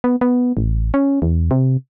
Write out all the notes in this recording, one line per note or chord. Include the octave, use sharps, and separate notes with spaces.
B3
B3
A1
C#4
E2
C3